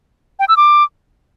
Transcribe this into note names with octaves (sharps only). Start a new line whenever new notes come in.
G5
E6
D6